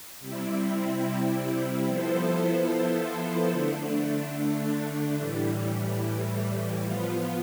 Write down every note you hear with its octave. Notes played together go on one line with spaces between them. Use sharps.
C3 G3 C4 E4
F3 B3 E4 A4 C5
D3 A3 D4
A2 E3 G3
F3 B3 F4